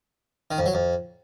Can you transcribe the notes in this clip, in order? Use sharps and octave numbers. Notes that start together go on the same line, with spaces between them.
D#3
F2
F#3
F2